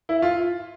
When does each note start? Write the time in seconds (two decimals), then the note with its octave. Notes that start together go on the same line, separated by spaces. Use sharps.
0.09 E4
0.22 F4